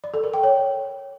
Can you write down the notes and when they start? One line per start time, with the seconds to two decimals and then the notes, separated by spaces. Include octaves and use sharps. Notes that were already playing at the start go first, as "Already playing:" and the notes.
0.04 D5
0.14 A4
0.24 A#4
0.34 G5
0.44 C#5